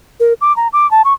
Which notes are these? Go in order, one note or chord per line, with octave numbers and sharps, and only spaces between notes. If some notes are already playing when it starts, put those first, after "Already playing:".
A#4
D6
A#5
D6
A5
C#6